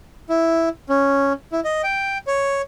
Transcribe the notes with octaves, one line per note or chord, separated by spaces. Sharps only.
E4
C#4
E4
D#5
G5
C#5